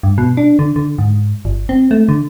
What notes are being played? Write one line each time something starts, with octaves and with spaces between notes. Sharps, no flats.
G2
B2
D4
D3
D3
G#2
G1
C4
A3
D3